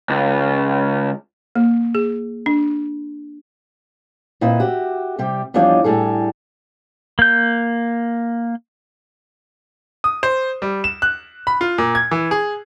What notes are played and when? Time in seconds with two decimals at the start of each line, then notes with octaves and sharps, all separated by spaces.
0.10 C#2
1.55 A#3
1.95 G#4
2.46 D4
4.41 A#2 C4 E4 B4 D#5
4.60 F#4 G4 E5
5.19 C3 G3 G4
5.54 E2 F3 G3 D4 C#5 D#5
5.84 A2 G3 G#4 A4
7.19 A#3 G6
10.04 D#6
10.23 C5
10.62 G3
10.84 E7
11.02 F#6
11.47 B5
11.61 F4
11.78 A#2
11.95 G#6
12.11 E3
12.31 G#4